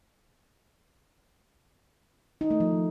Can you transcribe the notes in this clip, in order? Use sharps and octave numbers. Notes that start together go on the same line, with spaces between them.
D#4
A3
F3